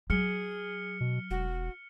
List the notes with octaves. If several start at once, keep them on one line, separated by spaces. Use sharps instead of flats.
F#3 G#4 F6 C#7 G7
B2
E1 F#4